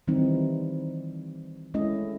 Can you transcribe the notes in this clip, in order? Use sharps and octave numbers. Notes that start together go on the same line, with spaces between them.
D#3 E3 G3 C4 D#4 E4
G#3 A3 C#4 E4 D#5